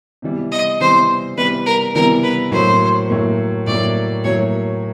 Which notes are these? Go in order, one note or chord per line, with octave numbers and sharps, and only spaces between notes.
C3 E3 G3 B3
D#5
C3 E3 G3 B3 C5
C3 E3 G3 B3 B4
A#4
C3 E3 G3 B3 A#4
B4
A2 F#3 A#3 C5
A2 F#3 A#3
A2 F#3 A#3 D5
A2 F#3 A#3 C#5